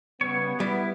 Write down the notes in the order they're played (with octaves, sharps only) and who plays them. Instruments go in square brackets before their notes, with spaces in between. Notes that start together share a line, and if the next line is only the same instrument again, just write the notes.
[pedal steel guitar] C#3 G3 C#5 [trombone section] B3
[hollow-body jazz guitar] G3 [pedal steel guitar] E4